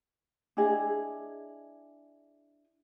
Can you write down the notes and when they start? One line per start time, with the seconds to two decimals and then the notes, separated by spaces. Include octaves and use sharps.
0.57 D4 E4 G#4 D#5